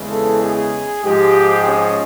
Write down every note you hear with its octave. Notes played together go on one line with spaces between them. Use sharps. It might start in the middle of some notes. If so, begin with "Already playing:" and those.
Already playing: E2 C#3 E3 G#3
A4
G#4
G#2 F3 G#3 G4
C#4